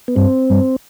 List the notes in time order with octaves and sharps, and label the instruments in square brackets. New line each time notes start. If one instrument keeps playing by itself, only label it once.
[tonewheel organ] B3
[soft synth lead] G2 [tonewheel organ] C4
[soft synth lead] G2